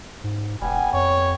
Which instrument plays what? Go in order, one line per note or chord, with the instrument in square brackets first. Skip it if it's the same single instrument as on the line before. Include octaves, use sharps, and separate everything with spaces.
[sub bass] G#2
[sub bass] E1 [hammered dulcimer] G3 B3 [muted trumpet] G#5
[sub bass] F2 [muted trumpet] C#5